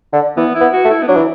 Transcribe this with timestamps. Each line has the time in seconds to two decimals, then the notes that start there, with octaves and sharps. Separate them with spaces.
0.13 D3
0.37 E3 B3
0.55 E4
0.61 B3
0.73 F#4
0.85 A3
0.90 E4
1.03 B3
1.08 F#3 D4
1.16 E3